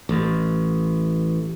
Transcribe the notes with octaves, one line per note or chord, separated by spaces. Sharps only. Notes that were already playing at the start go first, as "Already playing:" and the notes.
A1